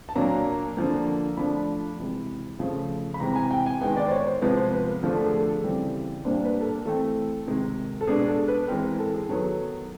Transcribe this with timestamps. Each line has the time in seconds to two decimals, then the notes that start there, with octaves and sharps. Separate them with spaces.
0.09 A5
0.15 A#2 F#3 A#3 D4 A#5
0.77 D3 F3 A#3
1.37 F3 A3 D4 B5
1.98 C3 E3 G#3
2.59 C#3 F3 A3
3.14 B5
3.20 C3 E3 G#3 C4 A#5
3.36 G#5
3.51 G5
3.66 G#5
3.81 D#3 G#3 B3 G5
3.97 D5
4.07 C5
4.12 C#5
4.27 C5
4.41 C3 F3 G#3 B3 B4
4.57 C5
4.72 B4
4.88 A#4
5.03 D3 F3 A3 D4 A#4
5.15 A4
5.26 G#4
5.39 A4
5.64 C#3 E3 G3 C4
6.25 A#2 G3 A#3 D4 C5
6.45 B4
6.61 A4
6.65 A#4
6.85 E3 A3 C4 A4
7.47 C3 D#3 G#3
8.01 A4
8.07 B2 G#3 B3 D4 G#4
8.28 A4
8.48 B4
8.68 E3 G#3 C4 A#4
8.99 A4
9.14 G#4
9.29 D#3 F#3 B3 A4